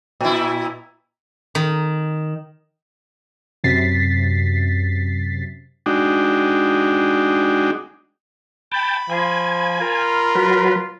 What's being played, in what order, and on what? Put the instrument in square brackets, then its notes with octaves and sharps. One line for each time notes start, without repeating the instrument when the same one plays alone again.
[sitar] A#2 E4
[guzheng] D#3
[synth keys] F#2 C3 A6 B6 C7
[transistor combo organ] G#3 D4 D#4 F#4 G5
[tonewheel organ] G5 A5 [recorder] B5
[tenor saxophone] F3 [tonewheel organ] G#5
[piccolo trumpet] F4 [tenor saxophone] A#4
[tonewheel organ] F#3 B4